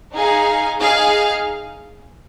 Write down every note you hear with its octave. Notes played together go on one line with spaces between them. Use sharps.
D#4 G#4 F5 G#5
D#4 G#4 F5